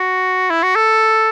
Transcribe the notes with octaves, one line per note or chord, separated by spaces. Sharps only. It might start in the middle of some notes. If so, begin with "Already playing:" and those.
Already playing: F#4
E4
F#4
A4